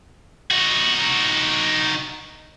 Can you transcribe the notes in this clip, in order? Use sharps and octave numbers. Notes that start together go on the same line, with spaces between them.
D#4 F#4